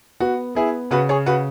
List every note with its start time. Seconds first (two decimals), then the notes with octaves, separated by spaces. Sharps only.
0.20 B3 F#4
0.55 B3 E4 G#4
0.91 C#3 F#4 B4
1.09 G#4 C#5
1.26 C#3 F#4 B4